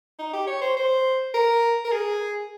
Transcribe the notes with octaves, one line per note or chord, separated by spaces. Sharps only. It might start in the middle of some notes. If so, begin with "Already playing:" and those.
D#4
G4
C#5
C5
C5
A#4
A#4
G#4